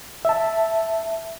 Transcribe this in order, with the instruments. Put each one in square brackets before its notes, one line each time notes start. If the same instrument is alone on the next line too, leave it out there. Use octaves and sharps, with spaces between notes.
[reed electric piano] E5 A5